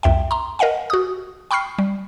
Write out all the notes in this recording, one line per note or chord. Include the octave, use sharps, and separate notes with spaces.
C2 F2 E5 G5
A#5 C6
A#4 D#5 F5 F#5 G#5
F#4 D#6
G5 B5 C#6 F6 C7
G3